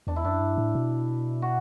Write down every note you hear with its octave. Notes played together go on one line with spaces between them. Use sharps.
E2 D4
E4
F#2 D4
G2
A2
B2
F#4